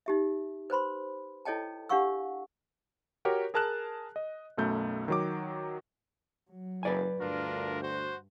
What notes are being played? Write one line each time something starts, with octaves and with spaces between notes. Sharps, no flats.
D#4 G4 E5
B4 C5 B5 C6
E4 A4 C#5 D#5 G5 A5
D4 G4 F5 F#5 C#6 E6
F#4 G4 A#4 C#5
G#4 A#4 A5 F6 F#6 E7
D#5
B1 F#2 A3 G6
D#3 F#3 D6
F#3
F#1 B4 D5 G#5
D2 G2 D4 F4 A#4
F#4 C5